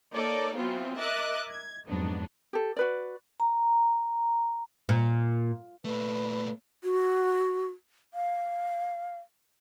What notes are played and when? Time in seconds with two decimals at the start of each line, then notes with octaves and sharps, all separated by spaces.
0.14 A#3 D#4 A4 C#5 D5
0.56 E3 F#3 B3 C4 F4
0.99 A#4 D#5 E5 D6 F#6 A6
1.49 G#6
1.88 F2 G#2 F#3 B3 D4
2.53 G4 A4
2.77 F#4 B4 D5
3.40 A#5
4.89 A#2
5.85 A#2 A3 B4
6.84 F#4
8.14 F5